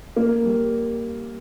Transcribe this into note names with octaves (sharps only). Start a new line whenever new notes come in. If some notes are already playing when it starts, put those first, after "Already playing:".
A#3
G3